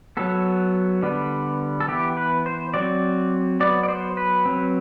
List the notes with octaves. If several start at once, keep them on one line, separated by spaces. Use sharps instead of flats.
F#3 B3 A4
D3 G3 B3
A4
E3 B3 G4
B4
C5
F#3 C4 D5
F#3 B3 D5
D5
C5
B4
F#3 C4